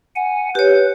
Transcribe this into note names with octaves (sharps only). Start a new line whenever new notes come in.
F#5 G#5
G4 B4 C#5